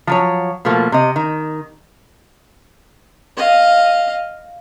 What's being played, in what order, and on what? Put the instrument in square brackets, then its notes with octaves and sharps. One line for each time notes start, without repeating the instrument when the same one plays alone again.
[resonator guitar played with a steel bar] F3 F#3 C#5
B2 F3 A3 A#3
C3 D#5
D#3
[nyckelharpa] D#5 F5